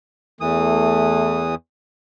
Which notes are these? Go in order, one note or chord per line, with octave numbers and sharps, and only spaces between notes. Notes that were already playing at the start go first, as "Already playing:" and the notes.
E2 E3 A3 D#6